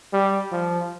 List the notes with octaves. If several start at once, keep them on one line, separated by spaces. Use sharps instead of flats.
G3
F3